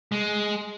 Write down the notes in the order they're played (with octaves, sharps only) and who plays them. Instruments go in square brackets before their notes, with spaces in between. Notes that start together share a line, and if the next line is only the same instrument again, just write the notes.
[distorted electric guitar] G#3